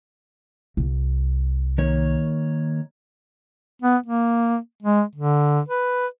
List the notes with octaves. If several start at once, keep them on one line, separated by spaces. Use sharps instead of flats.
C2
D#3 A#3 C#5
B3
A#3
G#3
D3
B4